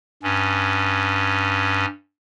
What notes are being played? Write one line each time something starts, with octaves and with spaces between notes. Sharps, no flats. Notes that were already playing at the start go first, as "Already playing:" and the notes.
G2 C#4